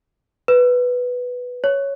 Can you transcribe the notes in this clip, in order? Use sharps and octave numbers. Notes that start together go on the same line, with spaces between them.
B4
C#5